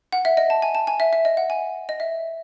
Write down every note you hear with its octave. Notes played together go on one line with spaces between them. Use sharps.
F#5
E5
D#5
A5
G#5
A5
G#5
E5
E5
D#5
F#5
G#5
D#5
E5